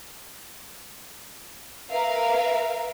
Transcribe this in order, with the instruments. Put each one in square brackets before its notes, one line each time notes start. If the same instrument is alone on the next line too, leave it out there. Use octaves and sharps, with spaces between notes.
[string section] A#4 B4 E5 F5